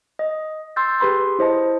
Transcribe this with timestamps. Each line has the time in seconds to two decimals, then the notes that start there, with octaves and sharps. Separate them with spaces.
0.19 D#5
0.76 C6 E6 G6 A6
1.00 G4 G#4 B4 B5 C6
1.39 E4 C5 D#5 A5